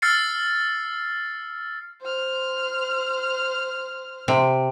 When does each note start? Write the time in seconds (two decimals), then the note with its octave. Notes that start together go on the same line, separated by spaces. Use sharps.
0.02 E6 F6 A6 C7 C#7
2.02 C5 F6
4.28 C3